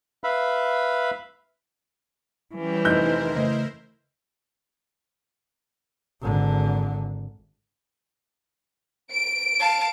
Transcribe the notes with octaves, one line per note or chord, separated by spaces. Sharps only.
B4 E5 F5 B5
E3 G3 C#4 G4
F1 D#4 E4 A#4 C5 G6
C#3 A3 D#5
G#1 D3
D7
F5 A5